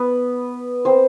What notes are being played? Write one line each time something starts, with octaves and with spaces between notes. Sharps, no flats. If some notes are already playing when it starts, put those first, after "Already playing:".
Already playing: B3 B4
C4 C5